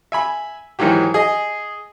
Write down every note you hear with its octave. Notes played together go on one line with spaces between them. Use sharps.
E5 G#5 B5
G#2 D#3 E3 F#3 G4
G#4 D#5